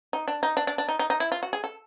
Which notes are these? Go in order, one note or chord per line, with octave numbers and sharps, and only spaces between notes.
D#4
D4
D#4
D4
D4
D4
D#4
D#4
D#4
E4
F4
F#4
G#4
A4